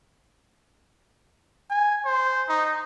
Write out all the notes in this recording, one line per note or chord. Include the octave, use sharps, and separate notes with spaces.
G#5
C5
D#4